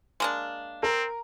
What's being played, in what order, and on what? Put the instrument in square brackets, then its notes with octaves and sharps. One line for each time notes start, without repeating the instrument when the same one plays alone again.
[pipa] G#3 A#3 D4
[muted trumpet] C4 [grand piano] A#4